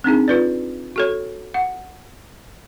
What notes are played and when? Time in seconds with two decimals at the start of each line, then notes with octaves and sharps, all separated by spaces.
0.04 C4 D4 D#4 G#4
0.28 F4 B4 D5
0.96 F#4 A4 C#5
1.54 F#5